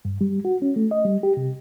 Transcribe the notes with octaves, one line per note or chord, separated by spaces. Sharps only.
G2
G3
F#4
C#4
A3
D#5
G3
G4
C3